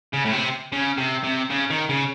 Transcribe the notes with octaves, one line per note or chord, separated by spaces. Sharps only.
C#3
A2
C3
C#3
C3
C3
C#3
D#3
C#3